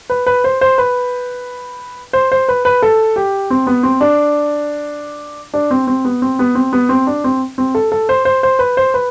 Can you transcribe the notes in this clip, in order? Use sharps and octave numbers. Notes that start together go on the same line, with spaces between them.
B4
B4
C5
C5
B4
C5
C5
B4
B4
A4
G4
C4
B3
C4
D4
D4
C4
C4
B3
C4
B3
C4
B3
C4
D4
C4
C4
A4
A4
C5
C5
C5
B4
C5
B4